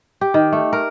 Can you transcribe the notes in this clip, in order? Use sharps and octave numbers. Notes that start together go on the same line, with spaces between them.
G4
D#3
A3
A#4